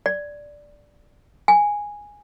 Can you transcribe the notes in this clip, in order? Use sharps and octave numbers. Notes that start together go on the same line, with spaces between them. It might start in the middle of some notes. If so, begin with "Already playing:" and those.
D5
G#5